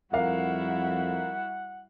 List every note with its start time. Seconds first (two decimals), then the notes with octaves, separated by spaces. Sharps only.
0.13 F2 G3 E4 F#4 A#4 F5 F#5